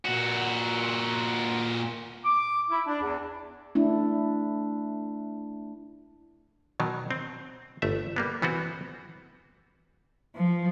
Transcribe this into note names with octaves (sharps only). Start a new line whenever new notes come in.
A#2 F#4
D6
E4
D4
E2
A3 D4 E4
B2 D#3 F#3
C4
G1 A3 E5
G3 A#3 B3
E3 B3 C4 F#4
F3